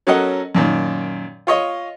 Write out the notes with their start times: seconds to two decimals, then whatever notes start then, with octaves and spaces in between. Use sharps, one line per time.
0.07 F#3 C#4 A4 A#4 D#5 F#5
0.55 F#2 A#2 D#3
1.47 F4 C#5 D#5